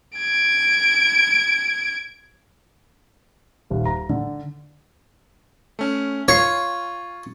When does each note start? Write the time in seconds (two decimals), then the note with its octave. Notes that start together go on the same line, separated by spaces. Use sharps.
0.17 G#6 D7
3.70 D#1
3.85 A#5
4.09 D3
5.79 A3 C#4
6.28 F4 C#5 C7